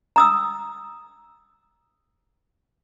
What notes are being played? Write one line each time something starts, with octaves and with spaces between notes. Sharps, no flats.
A#5 D#6 E6